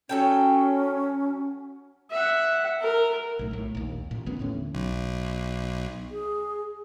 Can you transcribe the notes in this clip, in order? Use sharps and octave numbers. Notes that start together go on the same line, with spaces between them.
F#3 C#4 A4 G5
E5 F#5
A#4
B1 A2
B1 A2
A#1 D#2
A1 A#2
A1 E3 B3 C#4
D#2 A2 D3 C#4
B1
G#4